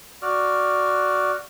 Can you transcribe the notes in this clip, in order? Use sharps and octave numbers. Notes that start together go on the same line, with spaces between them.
F#4 D5 F6